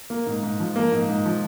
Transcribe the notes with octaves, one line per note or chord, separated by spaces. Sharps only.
A#3
G#2
G#2
F3
A#3
G#2
G#2
F3